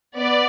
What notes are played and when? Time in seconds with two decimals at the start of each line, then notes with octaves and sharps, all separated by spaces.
0.18 B3 D5